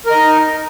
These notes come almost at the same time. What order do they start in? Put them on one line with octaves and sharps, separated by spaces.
A#4 D#5 D#4